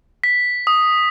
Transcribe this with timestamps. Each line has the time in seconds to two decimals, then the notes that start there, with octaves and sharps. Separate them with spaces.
0.24 B6
0.67 D#6